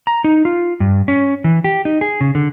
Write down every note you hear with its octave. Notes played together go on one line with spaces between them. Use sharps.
A#5
D#4
F4
G2
C#4
E3
G4
D#4
G#4
C#3
D3